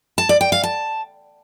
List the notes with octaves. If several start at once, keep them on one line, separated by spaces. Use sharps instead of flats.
A5
D5
G5
F5
A5